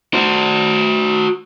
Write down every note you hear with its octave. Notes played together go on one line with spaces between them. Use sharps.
F#4 C5